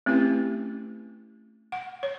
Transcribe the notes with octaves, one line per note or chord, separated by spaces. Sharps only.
A3 C4 C#4 E4 G4 B4
F#5
C#5